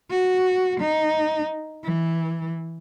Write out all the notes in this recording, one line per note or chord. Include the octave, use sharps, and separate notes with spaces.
F#4
D#4
E3